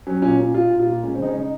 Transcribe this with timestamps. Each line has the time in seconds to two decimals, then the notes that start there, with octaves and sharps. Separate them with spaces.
0.07 F#3 C#4
0.22 A#2 C#4
0.38 A#2 C#4
0.54 A#2 F4
0.70 A#2
0.79 F4
0.87 A#2
1.03 G#3 C#4
1.15 C4
1.19 C#3 D#4
1.27 C#4
1.35 C#3 D#4